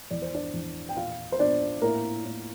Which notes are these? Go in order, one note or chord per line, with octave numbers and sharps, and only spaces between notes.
E2 D5
C5
D4 D5
E2
G5
A#2 F4 F5
C5
A#2 D4 D5
A2 A#3 A#4
A2